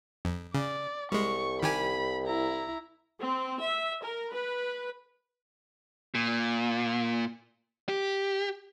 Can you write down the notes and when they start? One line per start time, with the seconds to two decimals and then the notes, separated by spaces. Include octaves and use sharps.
0.25 F2
0.54 C#3 D5
1.12 C2 G3 G#3 C#6
1.63 D#3 G4 G#5 B5
2.26 E4 A#5
3.21 C4
3.61 E5
4.02 A#4
4.33 B4
6.15 A#2
7.89 G4